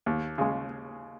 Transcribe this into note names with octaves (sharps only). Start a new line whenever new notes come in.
D#2
C#3 G#3